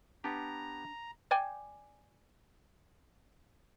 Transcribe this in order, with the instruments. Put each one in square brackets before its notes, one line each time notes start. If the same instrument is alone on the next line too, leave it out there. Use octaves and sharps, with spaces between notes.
[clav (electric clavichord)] B3 G4 [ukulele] D4 [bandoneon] A#5
[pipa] D5 G5 G#5